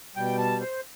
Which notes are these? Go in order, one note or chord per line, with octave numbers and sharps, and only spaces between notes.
B2 G3 G5
A5
C5